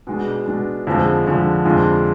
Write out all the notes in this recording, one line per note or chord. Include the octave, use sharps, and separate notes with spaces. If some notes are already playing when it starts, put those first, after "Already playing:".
B2 G#3 D4
B2 G#3 D4
F2 D3 F3 G#3
F2 D3 F3 G#3
F2 D3 G#3 D4 F4